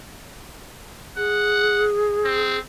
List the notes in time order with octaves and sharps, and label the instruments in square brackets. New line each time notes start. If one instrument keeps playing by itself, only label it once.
[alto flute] G#4 [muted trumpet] F#5
[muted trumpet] C4